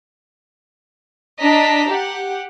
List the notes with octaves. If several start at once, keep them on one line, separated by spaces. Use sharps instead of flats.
D4 D#5 A5 A#5 B6
G4 F#5